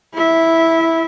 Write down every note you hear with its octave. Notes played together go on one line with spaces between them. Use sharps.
E4 E5